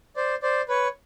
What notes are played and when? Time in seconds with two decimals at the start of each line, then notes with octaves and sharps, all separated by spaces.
0.16 C5 D5
0.43 C5 D5
0.69 B4 C#5